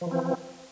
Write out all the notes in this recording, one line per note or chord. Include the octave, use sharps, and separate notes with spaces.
E3 F3 C4